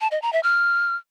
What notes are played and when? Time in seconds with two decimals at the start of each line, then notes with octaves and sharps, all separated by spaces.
0.01 A5
0.11 D#5
0.22 A#5
0.33 E5
0.43 F6